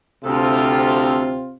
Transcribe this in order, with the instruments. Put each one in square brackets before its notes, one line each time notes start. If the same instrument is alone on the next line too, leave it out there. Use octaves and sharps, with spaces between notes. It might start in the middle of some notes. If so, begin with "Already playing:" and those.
[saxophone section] D2 A4 [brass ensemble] C3 C4 F4